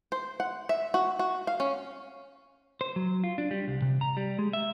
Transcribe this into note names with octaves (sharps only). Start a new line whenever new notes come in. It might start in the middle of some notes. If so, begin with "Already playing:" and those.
C5
F#5
E5
F#4
F#4
F5
C#4
C5
F#3
F4
D4
G3
C2
C3
A#5
G3
G#3
E5